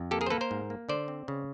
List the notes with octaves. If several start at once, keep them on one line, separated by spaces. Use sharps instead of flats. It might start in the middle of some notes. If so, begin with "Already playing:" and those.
Already playing: F2
A#3 G4 A4
G#4 A#4
C5
A#3 A4 B4
A#4 C5
G#2
A#3
D3 C5 D5
C4
C#3